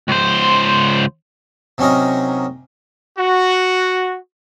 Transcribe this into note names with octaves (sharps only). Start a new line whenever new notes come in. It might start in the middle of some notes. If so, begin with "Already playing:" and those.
C#2 C5
C3 F#3 C#4 D#4 A#4
F#4